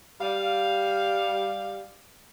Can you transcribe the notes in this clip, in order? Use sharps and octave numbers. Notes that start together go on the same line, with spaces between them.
G3 F5